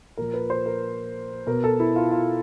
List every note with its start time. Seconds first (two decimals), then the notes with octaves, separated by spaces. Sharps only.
0.17 A#2 F3 A#4
0.34 B4
0.50 C5
0.66 A#4
1.47 B2 A#4
1.64 A4
1.80 E4
1.96 F4
2.11 F4